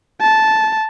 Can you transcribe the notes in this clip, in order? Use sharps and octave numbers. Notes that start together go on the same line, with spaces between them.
A5